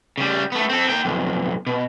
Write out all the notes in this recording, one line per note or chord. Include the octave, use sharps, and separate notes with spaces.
C#3 G3
A3 B3
C4 A4
A#3 G5
B1 F2
B2